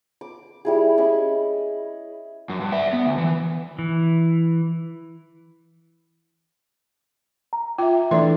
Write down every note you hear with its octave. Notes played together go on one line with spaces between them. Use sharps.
D6
G3 E4 G#4
C#4 D#5 B5 C#6
F#2
G2
D5 E5
B3
D2
E3
E3
A#5
F4 E5 G5
E3 A3 D4 D5 C6